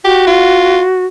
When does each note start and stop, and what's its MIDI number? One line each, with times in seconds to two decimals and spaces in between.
0.05 1.06 66
0.05 0.23 67
0.27 0.82 65